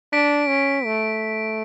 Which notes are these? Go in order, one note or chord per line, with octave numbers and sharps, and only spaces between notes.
D4 B6 D7
C#4
A3